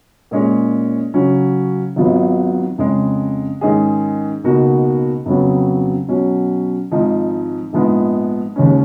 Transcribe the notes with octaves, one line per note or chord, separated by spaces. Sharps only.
A#2 G#3 C#4 G#4 C#5
C#3 F#3 C#4
G#1 G#2 F#3 B3 F4
F2 C#3 G#3
G#2 D#3 G#3 C#4 G#4
C#2 B2 A#3 D#4 F#4
F2 C#3 F#3 B3
B2 F#3 C#4
G#1 G#2 F3 G#3 D#4
A#1 G#2 F3 G#3 B3
D#2 C#3 G#3 C#4